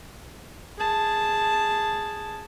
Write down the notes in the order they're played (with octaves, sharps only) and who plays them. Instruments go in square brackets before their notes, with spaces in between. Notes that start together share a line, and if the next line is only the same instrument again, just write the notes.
[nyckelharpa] G#4 A5